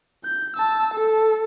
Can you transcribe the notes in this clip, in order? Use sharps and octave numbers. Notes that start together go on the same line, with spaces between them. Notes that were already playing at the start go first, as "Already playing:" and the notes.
G6
A5 E6
A4